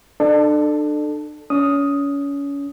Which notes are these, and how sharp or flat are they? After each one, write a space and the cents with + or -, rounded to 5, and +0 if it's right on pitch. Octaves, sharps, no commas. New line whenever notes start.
D4 +35 A4 +0
C#4 +30 D#6 +0